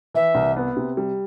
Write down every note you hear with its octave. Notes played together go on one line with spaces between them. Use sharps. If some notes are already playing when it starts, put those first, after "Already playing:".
E3 E5
C2
B3
C3
G3